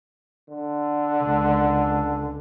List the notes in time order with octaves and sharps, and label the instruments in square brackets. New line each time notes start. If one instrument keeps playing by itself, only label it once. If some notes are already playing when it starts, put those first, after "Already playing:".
[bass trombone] D3
[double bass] C#2